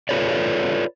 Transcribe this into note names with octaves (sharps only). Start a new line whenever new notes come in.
F4 A4 B4 C#5 D5